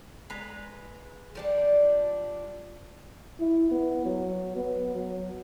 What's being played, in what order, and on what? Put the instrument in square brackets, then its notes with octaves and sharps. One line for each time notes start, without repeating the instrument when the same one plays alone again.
[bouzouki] G#3 B4 A#5
F3 G3 D4
[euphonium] E4
B3
F#3
B3
F#3